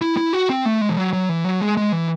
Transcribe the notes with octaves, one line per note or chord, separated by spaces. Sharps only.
E4
E4
F#4
C4
A3
G#3
E3
F#3
F#3
E3
F#3
G#3
G#3
E3